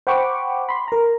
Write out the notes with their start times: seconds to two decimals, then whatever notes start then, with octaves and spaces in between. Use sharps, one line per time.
0.07 C5 F#5 G5 B5 C#6 D6
0.69 B5 C6
0.88 A#4 A#5